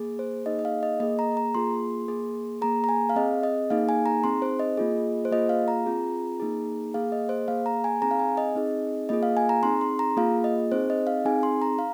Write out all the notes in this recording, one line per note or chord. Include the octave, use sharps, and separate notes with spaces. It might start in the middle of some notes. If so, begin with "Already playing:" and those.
Already playing: A#3 G#4
C5
A#3 D#4 G#4 D#5
D#5
F5
D#5
A#3 G#4 D#5
A#5
A#5
A#3 F4 G#4 C6
A#3 G#4
A#3 G#4 A#5
A#5
G#5
F5
C4 G#4 D#5
D#5
A#3 D#4 G#4 F5
G#5
A#5
C4 D#4 G#4 C6
C5
D#5
A#3 F4 G#4
C5
A#3 F4 G#4 D#5
F5
A#5
C4 F4 G#4
A#3 D#4 G#4
A#3 G#4 F5
D#5
C5
A#3 G#4 F5
A#5
G#5
C4 D#4 G#4 A#5
F5
G#5
D#5
C4 D#4 G#4
A#3 F4 G#4 D#5
F5
G#5
A#5
C4 D#4 G#4 C6
C6
A#5
A#3 F4 G#4 F5
D#5
C4 D#4 G#4 C5
D#5
F5
C4 D#4 G#4 G#5
C6
A#5
F5